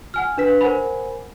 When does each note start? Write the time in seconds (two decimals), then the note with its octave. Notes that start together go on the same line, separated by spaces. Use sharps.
0.14 F#5 G#5 F6
0.38 D4 B4 B6
0.61 A#4 C5 F#5 G#5 B5